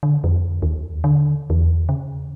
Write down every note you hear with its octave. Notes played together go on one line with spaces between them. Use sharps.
D3
F2
D#2
D3
E2
C#3